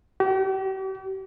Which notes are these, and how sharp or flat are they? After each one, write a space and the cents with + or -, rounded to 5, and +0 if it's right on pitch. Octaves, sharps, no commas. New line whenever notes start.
G4 -40